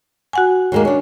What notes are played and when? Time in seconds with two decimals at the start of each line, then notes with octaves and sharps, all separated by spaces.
0.33 F#4 F#5 G#5
0.72 D#2 G#3 A#3
0.85 C#4 D4